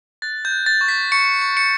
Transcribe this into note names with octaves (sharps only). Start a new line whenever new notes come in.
F#6 A6
G6
F#6
A6
C#6
B6
C#6 C#7
C#6
C#7